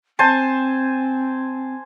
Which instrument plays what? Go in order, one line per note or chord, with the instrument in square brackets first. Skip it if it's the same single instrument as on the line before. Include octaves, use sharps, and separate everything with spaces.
[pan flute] C4 [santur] C5 G#5 A5